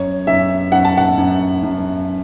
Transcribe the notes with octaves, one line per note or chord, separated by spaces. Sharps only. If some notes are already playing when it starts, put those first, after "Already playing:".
Already playing: F#2 C#5
F#2 E5
F#2 F#5
A5
F#5
F#2
F#2